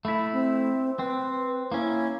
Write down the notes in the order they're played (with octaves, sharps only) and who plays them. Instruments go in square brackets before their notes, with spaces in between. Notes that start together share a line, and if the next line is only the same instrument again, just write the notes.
[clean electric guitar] A3 E4 [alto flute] B5
[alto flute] C4
[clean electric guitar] C4 [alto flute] B4
[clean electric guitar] A#3 C#4 [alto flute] E4